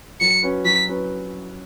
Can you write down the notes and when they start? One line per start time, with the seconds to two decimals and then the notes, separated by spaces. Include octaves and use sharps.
0.21 F#3 C#7
0.43 C#4 F#4 B4
0.65 F#3 B6
0.88 C#4 F#4 B4